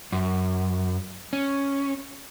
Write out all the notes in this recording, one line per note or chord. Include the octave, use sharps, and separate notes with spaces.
F#2
C#4